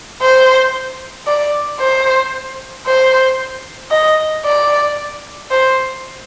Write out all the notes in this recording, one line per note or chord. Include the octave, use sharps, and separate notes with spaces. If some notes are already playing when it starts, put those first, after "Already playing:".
C5
D5
C5
C5
D#5
D5
C5